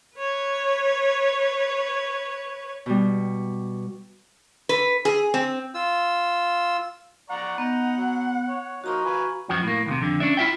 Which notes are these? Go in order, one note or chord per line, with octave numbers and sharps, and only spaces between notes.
B4 C#5
B2 G3
B4
G#4
C4
F4 E6
D5 F#5 A#5 C#6
B3 D#4 A#5
F#3
C#5
F3 A#3 D#4 F#4 A#5 C#6
B4 F5 G#5
F#2 F3 F#4
A2 A#3
D#2 A2 C3
F2 D3
C#4 D4 D5 E5
E4 F4 E5 G5